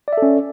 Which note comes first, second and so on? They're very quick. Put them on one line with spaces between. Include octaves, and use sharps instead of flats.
D5 E5 A4 C#4